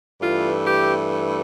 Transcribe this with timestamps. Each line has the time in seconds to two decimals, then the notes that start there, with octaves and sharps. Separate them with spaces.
0.20 G2 E3 A3 F4
0.63 G4